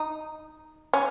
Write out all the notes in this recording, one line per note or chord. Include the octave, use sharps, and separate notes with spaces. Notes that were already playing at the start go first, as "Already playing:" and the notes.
Already playing: D#4
C#4